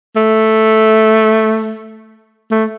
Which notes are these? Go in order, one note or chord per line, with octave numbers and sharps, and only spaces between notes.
A3
A3